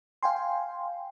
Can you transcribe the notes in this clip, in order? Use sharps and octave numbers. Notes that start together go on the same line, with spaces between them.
F5 G5 G#5 C6